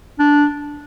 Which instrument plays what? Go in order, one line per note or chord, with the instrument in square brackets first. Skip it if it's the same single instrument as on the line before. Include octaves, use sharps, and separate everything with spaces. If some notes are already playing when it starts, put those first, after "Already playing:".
[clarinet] D4